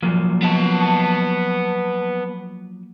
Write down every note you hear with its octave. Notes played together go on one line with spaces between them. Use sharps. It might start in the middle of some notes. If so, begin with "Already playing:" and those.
F3 F#3 A#3
B3 A5